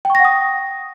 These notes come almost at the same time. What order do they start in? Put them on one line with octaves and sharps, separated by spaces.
G5 C#6 A#6 F#5 D#6